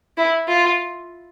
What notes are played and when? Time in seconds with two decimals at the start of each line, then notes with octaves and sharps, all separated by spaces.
0.17 E4
0.48 F4